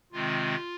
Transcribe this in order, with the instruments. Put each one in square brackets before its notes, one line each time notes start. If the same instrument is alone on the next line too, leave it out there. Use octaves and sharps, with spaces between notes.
[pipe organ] C3 D#3 G#3 C4 F4